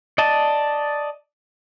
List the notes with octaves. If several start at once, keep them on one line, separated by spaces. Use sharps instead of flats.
D5 D#5 A5